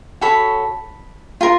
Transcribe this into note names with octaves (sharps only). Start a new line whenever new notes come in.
F#4 A4 C#5 B5
F4 A#4 C6